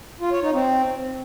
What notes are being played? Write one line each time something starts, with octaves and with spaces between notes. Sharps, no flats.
F4
C#5
D#4
C4